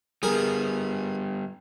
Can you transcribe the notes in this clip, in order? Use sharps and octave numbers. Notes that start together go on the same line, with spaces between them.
G3 B3 G#4 A#4